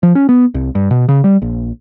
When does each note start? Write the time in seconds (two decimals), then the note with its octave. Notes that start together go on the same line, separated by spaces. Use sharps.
0.03 F3
0.15 C#4
0.29 B3
0.54 C2
0.75 G2
0.91 B2
1.09 C#3
1.24 G3
1.42 A#1